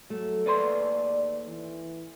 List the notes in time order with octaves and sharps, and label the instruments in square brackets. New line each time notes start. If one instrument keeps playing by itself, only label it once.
[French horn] F#3 [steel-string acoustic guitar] A3
[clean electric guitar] D#2 B4 C6 [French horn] D5
[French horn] E3